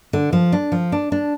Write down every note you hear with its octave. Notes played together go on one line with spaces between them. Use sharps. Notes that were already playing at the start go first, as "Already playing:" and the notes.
D3
F3
D4
F3
D4
D4